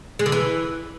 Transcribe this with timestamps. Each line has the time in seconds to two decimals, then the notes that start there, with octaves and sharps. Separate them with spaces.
0.19 G#3
0.26 D3
0.32 E3